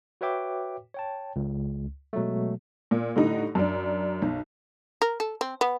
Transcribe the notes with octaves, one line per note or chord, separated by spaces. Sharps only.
F#4 B4 C#5 E5 G5 D6
C#5 G5 A5
C#2
B2 F#3 G#3 A3
A#2
A2 D3 G3 D#4
F#2 D4
B1
A#4
A4
C4
B3